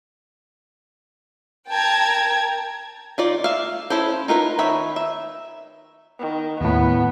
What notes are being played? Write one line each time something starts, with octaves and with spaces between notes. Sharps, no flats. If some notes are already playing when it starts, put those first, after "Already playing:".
A#4 G5 A5 A#5 G#6
D#3 F4 D5
E5 F5
C#4 E4 A4 C5
D#4 F4 A#4 B4
D#3 C#5 E5 B5
E5
D#3
D#2 A2 B3